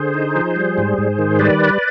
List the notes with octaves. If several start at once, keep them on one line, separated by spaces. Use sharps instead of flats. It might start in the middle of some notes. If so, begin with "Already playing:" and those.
Already playing: D3 G#4 C5
D#4
F3
G3
G#2
G#2
D#3
G3 B4 D5